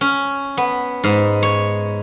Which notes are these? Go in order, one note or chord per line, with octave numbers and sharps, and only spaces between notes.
C#4
B3
G#2
C#5